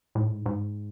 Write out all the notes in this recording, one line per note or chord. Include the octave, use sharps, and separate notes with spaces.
A2
G#2
G#2